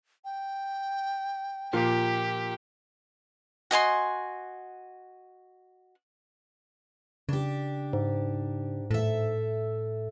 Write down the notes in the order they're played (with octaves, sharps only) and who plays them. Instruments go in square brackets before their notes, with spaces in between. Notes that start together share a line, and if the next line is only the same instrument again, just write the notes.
[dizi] G5
[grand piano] A#2 F3 A#3 [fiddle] G4
[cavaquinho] F#4 D#5 G#5 C6
[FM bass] C#3 [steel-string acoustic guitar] D4 G4
[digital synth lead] G#2
[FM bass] A2 [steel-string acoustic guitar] A4 E5